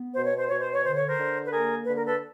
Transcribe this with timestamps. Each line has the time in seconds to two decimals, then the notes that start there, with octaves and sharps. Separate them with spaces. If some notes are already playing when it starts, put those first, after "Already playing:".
Already playing: B3
0.15 B2 C5
0.26 C#5
0.37 C5
0.49 B2 C#5
0.61 C5
0.73 C#5
0.83 D3 C5
0.96 C#5
1.08 A#4 C5
1.18 D3
1.46 B4
1.51 A#3 G#4 A#4
1.85 D3 B4
1.96 A#4
2.07 A4 B4